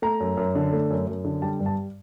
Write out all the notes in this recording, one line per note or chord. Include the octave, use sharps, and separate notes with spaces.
A3 A#5
F#2
F#2
D3
A3
F#2
F#2
D3
G3 A5
G2
A5